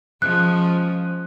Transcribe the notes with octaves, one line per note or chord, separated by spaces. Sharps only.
F3 G#3 C#4 F#6